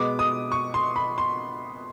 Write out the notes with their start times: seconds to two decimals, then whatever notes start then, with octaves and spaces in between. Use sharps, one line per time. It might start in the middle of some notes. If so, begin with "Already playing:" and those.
Already playing: B2 G#3 B3 D6
0.19 D#6
0.52 C#6
0.74 C6
0.96 B5
1.18 C6